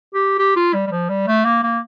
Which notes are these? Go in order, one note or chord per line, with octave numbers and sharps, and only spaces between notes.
G4
G4
F4
G3
G3
F3
G3
A3
A#3
A#3